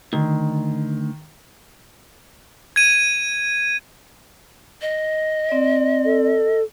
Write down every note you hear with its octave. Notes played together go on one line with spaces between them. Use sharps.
D2 D#3
G#6 D#7
D#5
C4 D5
A4